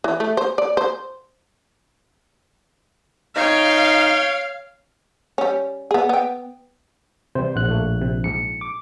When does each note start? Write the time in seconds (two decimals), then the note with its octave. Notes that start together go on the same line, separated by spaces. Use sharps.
0.04 E3
0.20 A3
0.37 C5
0.58 D5
0.77 C5
3.36 D#4 C#5 F5 G5
5.38 G3 C#4
5.91 B3 G#4
6.09 B3 G5
7.35 C3 E3 G3 C5
7.56 A#1 F#5 F#6
7.69 A2 A3 A#3
8.02 C3
8.24 A#1 G#2 C#7
8.61 D6